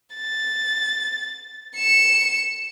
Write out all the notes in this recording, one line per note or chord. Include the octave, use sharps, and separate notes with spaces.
A6
C#7 E7